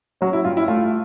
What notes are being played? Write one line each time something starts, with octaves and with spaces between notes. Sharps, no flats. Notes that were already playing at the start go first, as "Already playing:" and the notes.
F#3 C#4 F#4
E4
G2 F4
E4
A3 F4